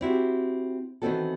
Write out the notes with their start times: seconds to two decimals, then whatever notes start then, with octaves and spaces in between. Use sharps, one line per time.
0.01 C4 E4 F#4 G4
1.02 D#3 E3 B3 C4 F#4 A4